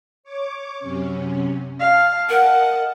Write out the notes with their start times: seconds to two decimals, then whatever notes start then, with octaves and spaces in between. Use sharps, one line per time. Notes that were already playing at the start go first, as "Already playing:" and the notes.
0.24 C#5 D6
0.80 F#2 C3 C#4
1.80 F5 A5
2.29 A#4 D#5 F#5 A5